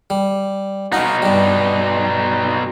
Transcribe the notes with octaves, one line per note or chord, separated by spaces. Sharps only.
G3
B2 D#4 F#4 F5
G2 G3